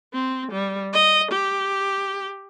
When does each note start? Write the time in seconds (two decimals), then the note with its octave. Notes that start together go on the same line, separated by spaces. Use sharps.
0.13 C4
0.51 G3
0.93 D#5
1.32 G4